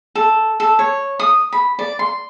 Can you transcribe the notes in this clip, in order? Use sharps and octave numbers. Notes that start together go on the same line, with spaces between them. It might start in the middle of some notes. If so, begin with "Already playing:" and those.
A4
A4
C#5
D#6
B5
D5
C6